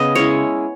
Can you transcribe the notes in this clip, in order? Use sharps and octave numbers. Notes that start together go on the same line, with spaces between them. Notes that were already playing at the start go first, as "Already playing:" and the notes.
Already playing: C#3 B3 D#5
G#3 C#4 E4 C#5